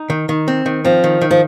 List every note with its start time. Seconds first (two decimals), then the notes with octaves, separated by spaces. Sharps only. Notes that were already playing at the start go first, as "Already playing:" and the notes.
Already playing: D#4
0.10 D#3
0.29 D#3
0.48 C4
0.66 D#3
0.85 F3 C4
1.04 D#3
1.21 D#3
1.31 F3